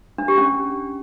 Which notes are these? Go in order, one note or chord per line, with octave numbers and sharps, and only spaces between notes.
D4
G4
C#4